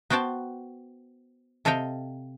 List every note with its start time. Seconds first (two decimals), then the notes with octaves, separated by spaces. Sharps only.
0.10 B3 F#4 C5 G5 A5
1.65 C3 A4 D#5 F5 G5